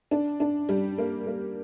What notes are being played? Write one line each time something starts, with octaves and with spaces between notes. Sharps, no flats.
D4
D4
G3
A#3
A#3